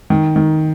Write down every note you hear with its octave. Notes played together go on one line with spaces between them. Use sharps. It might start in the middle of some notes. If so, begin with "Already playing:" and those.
D#3
D#3